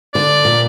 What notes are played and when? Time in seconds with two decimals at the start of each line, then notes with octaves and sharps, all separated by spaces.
0.14 D3 D5
0.45 A#2